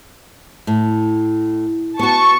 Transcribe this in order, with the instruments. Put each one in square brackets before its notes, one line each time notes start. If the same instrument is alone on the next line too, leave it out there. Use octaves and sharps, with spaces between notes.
[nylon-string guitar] A2
[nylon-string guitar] B3 F#4 [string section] A5 C#6